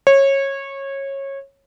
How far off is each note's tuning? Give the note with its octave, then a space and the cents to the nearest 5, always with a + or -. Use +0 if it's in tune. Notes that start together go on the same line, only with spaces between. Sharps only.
C#5 -20